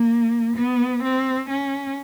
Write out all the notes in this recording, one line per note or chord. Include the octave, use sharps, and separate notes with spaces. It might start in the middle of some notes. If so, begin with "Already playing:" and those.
Already playing: A#3
B3
C4
C#4